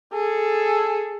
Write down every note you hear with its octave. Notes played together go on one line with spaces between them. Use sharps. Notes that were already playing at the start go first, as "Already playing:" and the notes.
G#4 A4